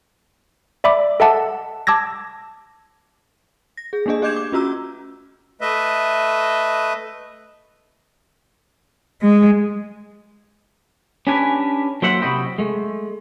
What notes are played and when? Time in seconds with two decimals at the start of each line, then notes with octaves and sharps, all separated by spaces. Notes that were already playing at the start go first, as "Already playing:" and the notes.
0.84 D5 E5 B5 D6
1.20 A4 D#5 E5 F#5 A5 D6
1.87 A5 D6 E6 G#6 A#6
3.77 A#6
3.93 G#4
4.06 A3 A#3 D4 G#4 D#5
4.22 G4 D#5 D6 G6 G#6 E7
4.36 D6
4.52 C#4 F4 F#4 A#5 E6
5.61 A3 B4 D#5 E5
9.21 G#3
11.27 C#4 D4 G4 A#4 B4 G#5
12.02 F#3 A#3 C5 E5 F#5
12.21 C3 E4 F#4 D#5 G5 B5
12.58 G#3 A3